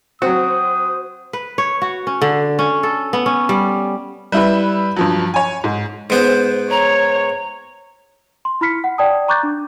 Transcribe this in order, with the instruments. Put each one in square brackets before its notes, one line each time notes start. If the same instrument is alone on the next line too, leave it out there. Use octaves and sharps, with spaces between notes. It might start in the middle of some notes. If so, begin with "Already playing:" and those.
[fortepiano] F#3 C4 [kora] F#4 [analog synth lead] C5 [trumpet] D#6
[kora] B4
C#5
F#4
C#4
D3
C#4
A4
B3
C#4
G3
[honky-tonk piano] G3 E4 B4
G2 F3 F#3
C#5 G#5
G#2
[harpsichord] G#2 B3 [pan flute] C5
[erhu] C#5 [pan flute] A#5
[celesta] C6
E4 B5 F6 B6 C#7
F#5
D5 G5 A5 D#6
A#5 C#6 D6 F#6 G6 A6
D4